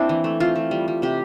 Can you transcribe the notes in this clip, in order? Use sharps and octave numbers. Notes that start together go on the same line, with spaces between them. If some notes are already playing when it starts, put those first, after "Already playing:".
Already playing: A#3 C4 D4 E4
E3
A3
C4 F4
A3
G3
G3
C3 G4